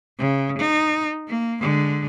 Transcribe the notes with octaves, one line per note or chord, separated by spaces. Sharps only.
C#3
D#4
A#3
D3 G#3